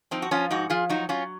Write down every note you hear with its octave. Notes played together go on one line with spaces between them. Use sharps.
F3 C4 D#4
F#4
F3 C#4 F4
G#2 D#4 F#4
F3 F4 G#4
F#3 D#4 F#4
F#3 C#4 F4